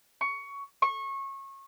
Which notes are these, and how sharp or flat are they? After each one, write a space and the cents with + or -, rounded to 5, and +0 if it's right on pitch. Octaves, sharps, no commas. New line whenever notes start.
C#6 +15
C#6 -25